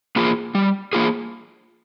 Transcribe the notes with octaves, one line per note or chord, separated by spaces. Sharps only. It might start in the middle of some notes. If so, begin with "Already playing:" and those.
A#3 F4 G#4
G3
A#3 F4 G#4